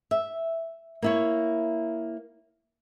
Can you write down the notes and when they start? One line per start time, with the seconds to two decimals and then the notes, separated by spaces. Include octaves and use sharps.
0.11 E5
1.02 A#3 E4 C#5